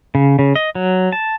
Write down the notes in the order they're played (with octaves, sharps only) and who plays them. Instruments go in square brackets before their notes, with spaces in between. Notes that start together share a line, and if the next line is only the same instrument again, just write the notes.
[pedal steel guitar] C#3
C#3
D#5
F#3
A5